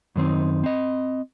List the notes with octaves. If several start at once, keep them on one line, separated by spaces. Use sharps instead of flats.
F#2 D#3 C4 D#4
C4 D#5